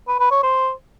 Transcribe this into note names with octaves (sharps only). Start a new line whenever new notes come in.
B4
B4
C#5
C5